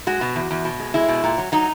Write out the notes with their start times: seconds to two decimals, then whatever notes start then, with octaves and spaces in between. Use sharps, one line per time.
0.07 G#3 F#4
0.21 B2
0.36 E2
0.51 E2
0.65 B2
0.80 G#3
0.94 G#3 E4
1.09 B2
1.24 A#2
1.38 F#3
1.52 F#3 D#4